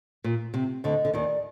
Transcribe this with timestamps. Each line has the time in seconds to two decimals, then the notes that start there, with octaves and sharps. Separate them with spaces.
0.24 A#2
0.54 C3
0.84 D2 D3 D#5
1.05 D3
1.14 D#2 D#3 D5